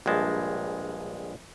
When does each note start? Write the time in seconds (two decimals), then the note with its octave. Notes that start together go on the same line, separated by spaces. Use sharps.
0.06 A#1 G2 G#3 A5